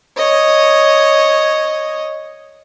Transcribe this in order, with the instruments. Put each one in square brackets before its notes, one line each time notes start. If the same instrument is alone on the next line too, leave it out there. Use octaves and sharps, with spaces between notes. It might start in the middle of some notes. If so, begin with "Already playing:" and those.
[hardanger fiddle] C#5 D#5